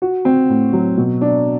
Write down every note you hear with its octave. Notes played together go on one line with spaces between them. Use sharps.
F#4
C4
A2
F#3
B2
D4